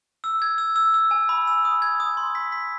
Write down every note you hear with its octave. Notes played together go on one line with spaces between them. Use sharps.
E6
G#6
E6
E6
E6
G#5
B5
E6
D#6
G#6
D#6
C6
B6
B6